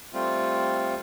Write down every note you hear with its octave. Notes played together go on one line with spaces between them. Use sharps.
G3 A3 C4 F4